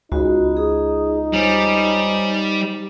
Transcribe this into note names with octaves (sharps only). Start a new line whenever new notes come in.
C#2 D#4 F#4 B5
G#4 D#6
G3 C5 C#5 G#5